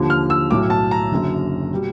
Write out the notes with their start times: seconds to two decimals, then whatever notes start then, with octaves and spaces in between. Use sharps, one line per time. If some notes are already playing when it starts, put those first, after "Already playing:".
Already playing: D#2 D3 F3
0.10 F6
0.30 E6
0.50 B1 A2 F#3 D6
0.70 A5
0.91 A#5
1.11 F#1 F#2 D3
1.73 B2 G3